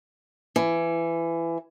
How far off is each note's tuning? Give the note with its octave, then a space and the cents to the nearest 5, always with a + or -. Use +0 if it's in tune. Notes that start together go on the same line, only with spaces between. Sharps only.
E3 +20